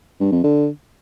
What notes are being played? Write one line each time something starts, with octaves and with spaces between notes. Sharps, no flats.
G2
F2
D3